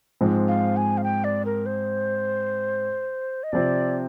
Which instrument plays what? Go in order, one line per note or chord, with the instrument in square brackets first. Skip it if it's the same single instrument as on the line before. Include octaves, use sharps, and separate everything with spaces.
[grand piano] G#2 F3 G#3 C4
[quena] F5
G#5
F5
G5
D5
A#4
C5
D#5
[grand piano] C3 F3 C4 [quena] D5